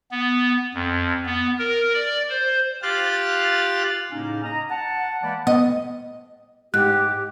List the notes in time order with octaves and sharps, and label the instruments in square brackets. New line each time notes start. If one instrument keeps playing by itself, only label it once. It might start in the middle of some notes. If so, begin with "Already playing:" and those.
[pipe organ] B3
F2
B3
A#4
D5
C5
F4 G4 F5 F#6 A6
[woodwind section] A2 C#3 A#3 C#4 D#4
D#5 A#5
F#5 A5
E3 G#3 A#3 D5 F#5 B5
[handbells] B3 [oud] D#5
[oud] G#2 [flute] G4 [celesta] F#6